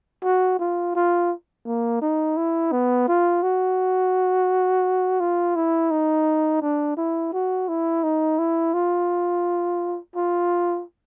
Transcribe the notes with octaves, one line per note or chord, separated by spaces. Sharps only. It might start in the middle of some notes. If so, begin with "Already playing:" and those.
F#4
F4
F4
A#3
D#4
E4
B3
F4
F#4
F4
E4
D#4
D4
E4
F#4
E4
D#4
E4
F4
F4